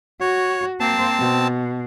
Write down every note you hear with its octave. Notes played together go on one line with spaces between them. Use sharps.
F#4 C#5
A#3 C4 C5 A5
B2